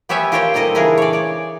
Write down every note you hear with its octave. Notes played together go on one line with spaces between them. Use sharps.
B3 G4 C#5 E5 G#5
F4 G4 A#4 C5 C#5 G5
A#2 G3 D#4 A4 D#5
C#3 E3 D4 G#4 A#4
C#5 D5
C#5 D5